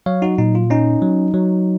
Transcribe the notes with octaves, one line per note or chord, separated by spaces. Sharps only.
F#3 C#5 F5
D#4 F#4
A#2 D#4
F4
C#4 D#4
F#3
F#3